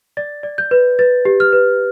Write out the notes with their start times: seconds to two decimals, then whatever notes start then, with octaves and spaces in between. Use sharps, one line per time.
0.17 D5 A6
0.43 D5
0.58 G6
0.71 B4
0.99 B4 A6
1.25 G4
1.40 F6
1.53 B4